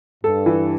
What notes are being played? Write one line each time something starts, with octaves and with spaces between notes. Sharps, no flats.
G2 A4
E3